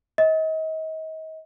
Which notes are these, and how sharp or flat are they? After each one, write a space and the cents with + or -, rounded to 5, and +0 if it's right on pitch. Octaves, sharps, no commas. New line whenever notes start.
D#5 +35